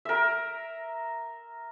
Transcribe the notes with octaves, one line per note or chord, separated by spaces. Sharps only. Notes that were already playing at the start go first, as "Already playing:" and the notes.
A#4 E5